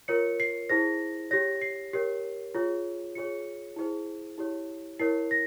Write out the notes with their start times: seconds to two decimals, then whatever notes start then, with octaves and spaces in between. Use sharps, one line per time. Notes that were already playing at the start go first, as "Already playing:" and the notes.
0.08 F4 A#4 C#5 C#7
0.40 C7
0.69 E4 G#4 C5 A#6
1.31 G4 C#5 A#6
1.62 C7
1.93 G4 A#4 C#5 C7
2.55 F4 G#4 C#5
3.15 F4 G#4 C#5 C#7
3.76 E4 G#4 C5
4.38 E4 G4 C#5
4.99 E4 A#4 C#5 C7
5.31 A#6